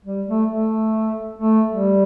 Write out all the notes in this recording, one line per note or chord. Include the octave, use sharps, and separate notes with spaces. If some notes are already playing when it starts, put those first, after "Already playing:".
G3
A3
A3
A3
G3